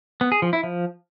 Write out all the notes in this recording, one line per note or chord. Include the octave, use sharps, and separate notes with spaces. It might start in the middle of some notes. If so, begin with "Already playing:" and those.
B3
G#4
F3
E4
F3